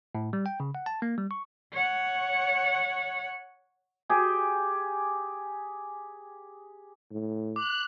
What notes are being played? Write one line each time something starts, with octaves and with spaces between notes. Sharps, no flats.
A2
G3
G5
C#3
F#5
A5
A#3
G3
C#6
C#5 F#5
G4 G#4 G5
A2
D6 F#6